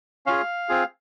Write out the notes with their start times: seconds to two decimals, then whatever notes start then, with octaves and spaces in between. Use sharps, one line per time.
0.26 C#4 F4 G#4 F5
0.69 C4 F4 G#4